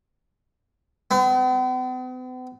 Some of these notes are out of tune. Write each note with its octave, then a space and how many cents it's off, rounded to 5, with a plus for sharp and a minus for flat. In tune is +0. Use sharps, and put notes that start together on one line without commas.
B3 +45